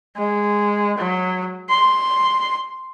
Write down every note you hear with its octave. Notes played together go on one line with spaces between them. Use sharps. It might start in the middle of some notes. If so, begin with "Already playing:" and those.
G#3
F#3
C6